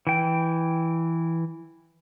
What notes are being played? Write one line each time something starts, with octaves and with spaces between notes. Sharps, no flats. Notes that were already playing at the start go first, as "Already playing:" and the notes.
E3 G5